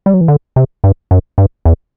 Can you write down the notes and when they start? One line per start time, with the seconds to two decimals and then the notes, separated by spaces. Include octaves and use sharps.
0.06 G3
0.14 F#3
0.21 E3
0.28 D3
0.56 C3
0.84 G2
1.11 F#2
1.38 G2
1.65 E2